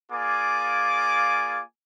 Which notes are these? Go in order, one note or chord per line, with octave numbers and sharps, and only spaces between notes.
A#3 F4 G#4 D5 G#5 D6